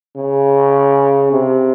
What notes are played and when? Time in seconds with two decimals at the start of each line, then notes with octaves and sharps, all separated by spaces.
0.16 C#3
1.32 C3